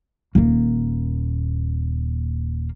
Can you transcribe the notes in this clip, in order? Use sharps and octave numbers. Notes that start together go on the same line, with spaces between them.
D#1 A#3